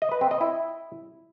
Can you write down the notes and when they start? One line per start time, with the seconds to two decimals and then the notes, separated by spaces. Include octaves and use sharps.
0.02 D#5
0.12 B4
0.21 C4
0.31 D#5
0.41 E4